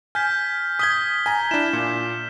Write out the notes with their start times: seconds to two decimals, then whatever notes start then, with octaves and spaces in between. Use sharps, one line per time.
0.15 G#5 F6 G6 B6
0.79 D#6 G#6 B6 G7
1.26 G#5 A#5
1.51 D4 E4 E7
1.73 A#2